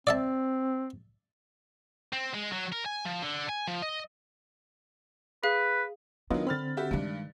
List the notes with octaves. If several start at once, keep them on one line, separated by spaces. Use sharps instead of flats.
C4 D5 E5 A5
C4
G#3
F#3
A#4
G#5
F3
D3
G#5
F3
D#5
G#4 B4 F5
D#3 F#3 B3 D4 F4 D#5
D3 C4 B5 F6 A6
F#4 G4 E5
G2 D#3 G#3 D4